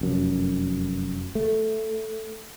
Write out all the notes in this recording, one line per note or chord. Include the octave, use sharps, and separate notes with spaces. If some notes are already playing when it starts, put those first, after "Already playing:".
F1 F#2
A3